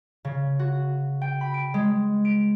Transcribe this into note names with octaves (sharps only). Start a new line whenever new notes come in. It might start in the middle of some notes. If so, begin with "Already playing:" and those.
C#3
F#4
G5
B5
D7
G#3
D7